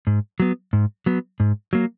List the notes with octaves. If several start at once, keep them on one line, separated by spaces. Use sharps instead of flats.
G#2
F#3 B3
G#2
F#3 B3
G#2
F#3 A#3